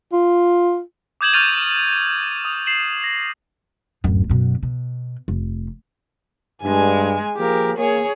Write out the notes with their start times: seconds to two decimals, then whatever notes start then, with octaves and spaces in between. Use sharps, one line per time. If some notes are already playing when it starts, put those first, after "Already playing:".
0.13 F4
1.21 D6 D#6 G6 G#6 E7 F#7
1.33 C#6 F6 G6 A6 D#7 F7
2.45 D#6
2.66 C7 E7 F#7
3.04 A#6
4.04 D1 F#2
4.30 F#2 B2
4.63 B2
5.28 F1
6.63 G2 G#3 G#5
7.37 F3 A#3 G4 G#4 A#4
7.78 A#3 G#4 C#5